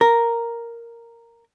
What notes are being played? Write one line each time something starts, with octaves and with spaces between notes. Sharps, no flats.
A#4